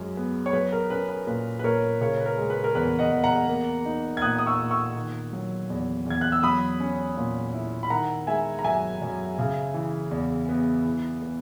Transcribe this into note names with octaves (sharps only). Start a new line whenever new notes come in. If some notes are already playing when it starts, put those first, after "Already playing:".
Already playing: F#2 G#3
B3
C#5
F#3 B4
A#4
C#4 B4
B4
A#2 B4
B4
A#2 A#4 C#5
C#3 A#4 C#5
B4
A#4
G#3
B4
A#4
E2 B4
D#5 F#5
E2
F#5 A#5
A#3
D#4
G#6
A#2 D#6 F#6
D#6
C#6 E6
A#2
C#6 E6
D#3
F#3
E2
E2 G#6
F#6
E6
F#3 B5 D#6
C#4
A#2
E4
B5
D#3 F#5 A#5
G#3 E5 G#5
A#5
F#2 E5 G#5
F#2
C#3
E3
E2
B3
E3
B3